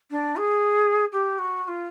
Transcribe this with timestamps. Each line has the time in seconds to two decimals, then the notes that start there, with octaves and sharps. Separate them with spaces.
0.11 D4
0.36 G#4
1.12 G4
1.38 F#4
1.64 F#4
1.68 F4